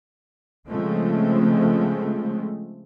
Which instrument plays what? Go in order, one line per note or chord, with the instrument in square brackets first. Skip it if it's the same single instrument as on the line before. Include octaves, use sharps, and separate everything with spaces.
[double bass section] C#3 F3 G#3 A3 C4